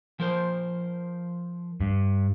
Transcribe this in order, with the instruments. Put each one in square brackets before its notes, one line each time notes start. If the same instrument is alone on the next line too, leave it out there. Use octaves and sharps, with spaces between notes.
[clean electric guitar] F3 A#4 C5
[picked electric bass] G2